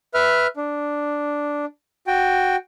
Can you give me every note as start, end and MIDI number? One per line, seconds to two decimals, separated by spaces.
0.14 0.47 71
0.14 0.47 76
0.14 0.47 89
0.57 1.65 62
2.07 2.56 66
2.07 2.56 79